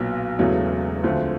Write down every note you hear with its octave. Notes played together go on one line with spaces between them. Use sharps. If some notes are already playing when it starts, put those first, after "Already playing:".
Already playing: B1 A#2 F#3 B3
E1 E2 C#3 F#3 A3
D2 D3 F3 A3 C4